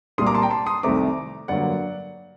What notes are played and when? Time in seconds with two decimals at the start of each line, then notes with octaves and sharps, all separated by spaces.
0.18 C2 A#2 G3 A#3 C6 D#6
0.27 A#5 D6
0.35 A5 C6
0.42 G5 A#5
0.50 A5 C6
0.66 C6 D#6
0.83 C2 C3 D#3 A3 C4 A#5 D6
1.48 G2 D3 F#3 A#3 D5 F#5